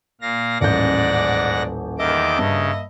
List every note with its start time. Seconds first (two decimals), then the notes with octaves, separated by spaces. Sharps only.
0.21 A#2 F5 A#6
0.61 D#1 A1 G#2 D5 F#5 G6 A#6
1.98 E2 D#3 A#3 D#5 E5 D6
2.38 G2 C#3